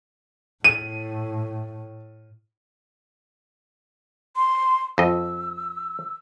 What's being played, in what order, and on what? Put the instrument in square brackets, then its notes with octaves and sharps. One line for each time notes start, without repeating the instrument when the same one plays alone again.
[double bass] A2 [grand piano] D#7
[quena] C6
[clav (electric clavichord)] F2 D#5 [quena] E6